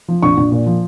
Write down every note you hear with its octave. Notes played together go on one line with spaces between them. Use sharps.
F3
A#1 C#6
A#1
A#2
F3